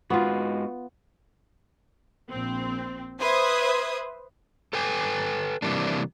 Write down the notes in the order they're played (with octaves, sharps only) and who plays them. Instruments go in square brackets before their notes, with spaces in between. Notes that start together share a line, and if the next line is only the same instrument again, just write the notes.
[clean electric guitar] G#2 F#4 [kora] B3 F4
[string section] A#1 C4
B4 C5 E5 D#6 G#6
[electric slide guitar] A4 B4 G5 G#5
C3 E3 G3 A#3 D4